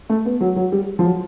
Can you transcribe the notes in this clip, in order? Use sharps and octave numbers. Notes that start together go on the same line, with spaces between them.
A3
B3
F#3
F#3
G3
F3
F#3